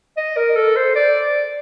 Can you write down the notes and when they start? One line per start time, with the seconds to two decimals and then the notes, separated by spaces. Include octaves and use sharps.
0.17 D#5
0.37 A#4
0.56 A4
0.76 C5
0.96 D5